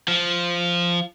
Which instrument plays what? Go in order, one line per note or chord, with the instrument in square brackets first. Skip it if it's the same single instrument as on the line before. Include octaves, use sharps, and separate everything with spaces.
[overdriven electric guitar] F3